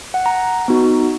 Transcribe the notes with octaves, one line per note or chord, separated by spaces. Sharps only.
F#5
A#5
B3 D#4 F#4